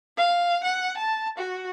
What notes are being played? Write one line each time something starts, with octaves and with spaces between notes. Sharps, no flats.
F5
F#5
A5
F#4